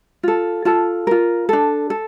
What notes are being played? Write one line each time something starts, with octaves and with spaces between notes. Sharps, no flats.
F4 A4
F4 A4 A5
F4 A#4
D4 A4
A4